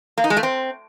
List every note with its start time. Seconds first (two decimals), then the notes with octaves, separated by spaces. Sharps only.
0.18 A#3
0.24 D#4
0.30 G#3
0.37 A3
0.43 C4